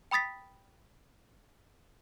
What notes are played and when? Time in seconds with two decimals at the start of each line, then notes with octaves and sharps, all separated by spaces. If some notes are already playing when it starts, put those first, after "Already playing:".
0.11 G5 B5 D#6 A6 B6